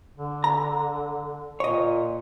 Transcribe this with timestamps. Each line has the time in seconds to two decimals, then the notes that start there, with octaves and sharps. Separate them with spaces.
0.17 D3
0.44 A#5
1.60 A#2 C#5 D#5